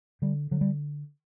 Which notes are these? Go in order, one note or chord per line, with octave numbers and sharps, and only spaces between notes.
D3 G3
D3 F#3
G3